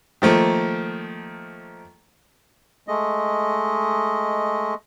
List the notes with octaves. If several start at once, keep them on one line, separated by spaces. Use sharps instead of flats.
D#3 F3 A3 A#3
G#3 A3 D#5